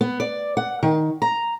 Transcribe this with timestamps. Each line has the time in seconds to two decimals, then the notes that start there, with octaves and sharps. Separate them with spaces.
0.01 B3
0.20 D5
0.57 F#5
0.83 D#3
1.22 A#5